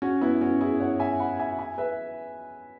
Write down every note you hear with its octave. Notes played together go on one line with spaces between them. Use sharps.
C#4 F#4
B3 E4
C#4 F#4
E4 G#4
C#5 F#5
E5 G#5
F#5 B5
E5 G#5
E5 G#5
B4 E5